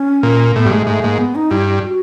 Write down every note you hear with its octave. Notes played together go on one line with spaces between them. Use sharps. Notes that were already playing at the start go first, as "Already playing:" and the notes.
Already playing: C#4
A#2
A2 B3
G2
G#2 A3
G#2 A3
G#2 A#3
B3
D#4
G2 E4
F#4